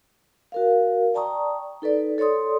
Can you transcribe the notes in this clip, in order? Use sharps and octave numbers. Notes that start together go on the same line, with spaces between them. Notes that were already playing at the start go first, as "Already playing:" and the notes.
F#4 A#4 F5
D5 G5 A5 A#5 C#6 D#6
D#4 A4 B4 D5
A4 C#5 D5 C6 D#6